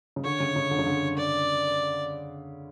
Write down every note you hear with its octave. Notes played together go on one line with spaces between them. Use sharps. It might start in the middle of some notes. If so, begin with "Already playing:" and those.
C#3
D3 C#5
C#3
C#3
D3
C#3
D3
D5